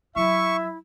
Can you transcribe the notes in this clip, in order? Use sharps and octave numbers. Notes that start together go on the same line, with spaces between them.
F#3 E4 E5 C#6